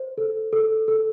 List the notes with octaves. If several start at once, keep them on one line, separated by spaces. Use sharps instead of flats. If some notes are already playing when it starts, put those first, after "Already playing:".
Already playing: C5
A4
A4
A4